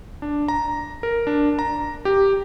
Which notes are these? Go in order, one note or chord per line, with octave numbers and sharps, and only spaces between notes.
D4
A#5
A#4
D4
A#5
G4